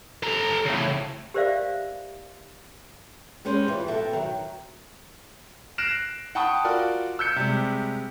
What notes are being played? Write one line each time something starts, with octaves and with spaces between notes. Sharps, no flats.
A4 A#5
A2 C#3
G4 A#4 C5 D5 E5 F5
G3 G#3 C#4 A#4 C5
F2 E3 G3
B2 A4 E5 G5
D#3 F#3
F6 F#6 A#6 C7 D7 E7
F#5 G5 A5 B5 C#6 D#6
F4 F#4 A#4 D5
E6 G6 C#7
C3 G3 G#3